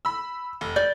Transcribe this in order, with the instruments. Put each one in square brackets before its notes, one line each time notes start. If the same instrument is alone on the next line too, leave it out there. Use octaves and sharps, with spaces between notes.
[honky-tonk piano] B5 E6
F1
[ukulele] D5 [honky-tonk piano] G6